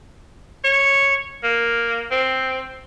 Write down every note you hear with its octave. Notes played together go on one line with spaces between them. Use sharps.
C#5
A#3
C4